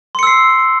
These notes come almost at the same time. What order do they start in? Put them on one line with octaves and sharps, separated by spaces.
C6 C#7 E6 C7